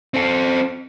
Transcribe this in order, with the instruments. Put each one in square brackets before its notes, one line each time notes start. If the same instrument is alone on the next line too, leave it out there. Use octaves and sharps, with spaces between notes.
[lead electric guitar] C4 A4